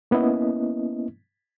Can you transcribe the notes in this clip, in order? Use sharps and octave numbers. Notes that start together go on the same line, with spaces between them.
A#3 B3 C#4 E4 D#5